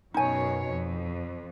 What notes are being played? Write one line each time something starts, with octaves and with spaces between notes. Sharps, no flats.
F#2 B2 D#4 C#5 G#5
F2